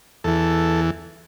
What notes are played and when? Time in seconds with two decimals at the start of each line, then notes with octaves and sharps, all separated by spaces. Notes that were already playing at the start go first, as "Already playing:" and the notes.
0.24 E2 E3 A4